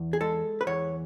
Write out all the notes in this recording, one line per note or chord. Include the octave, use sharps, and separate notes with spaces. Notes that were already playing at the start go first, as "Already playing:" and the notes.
Already playing: E2
G#4
G#3 A4
B4
E2 C#5